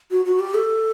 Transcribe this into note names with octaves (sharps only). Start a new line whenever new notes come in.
F#4
F#4
G4
A4